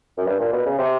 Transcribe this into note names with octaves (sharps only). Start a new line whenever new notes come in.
F#2
G2
A#2
B2
C#3
C3